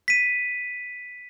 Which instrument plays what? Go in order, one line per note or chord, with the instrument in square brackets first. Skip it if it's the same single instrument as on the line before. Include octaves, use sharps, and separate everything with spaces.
[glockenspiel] B6 D#7